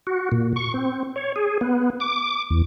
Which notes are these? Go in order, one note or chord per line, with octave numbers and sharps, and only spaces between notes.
F#4
A#2
C#6
C4
C#5
G#4
B3
D6
E2